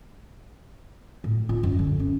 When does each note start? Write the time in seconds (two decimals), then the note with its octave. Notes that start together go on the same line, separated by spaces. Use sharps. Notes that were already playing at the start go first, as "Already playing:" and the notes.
1.24 A2
1.49 F4
1.63 F#2
1.79 D3
2.00 C#4